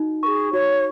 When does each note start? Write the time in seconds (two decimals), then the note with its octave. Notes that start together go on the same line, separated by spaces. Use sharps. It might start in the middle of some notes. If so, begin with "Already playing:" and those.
Already playing: D#4 F#4
0.23 A#4 C#6
0.27 G#4
0.53 F#4 C#5